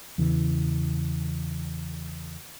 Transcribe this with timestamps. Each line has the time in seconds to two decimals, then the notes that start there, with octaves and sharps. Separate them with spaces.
0.18 E2 C#3 E3